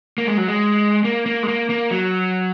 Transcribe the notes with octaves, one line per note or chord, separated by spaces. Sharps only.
A#3
G#3
F#3
G#3
A#3
A#3
G#3
A#3
A#3
F#3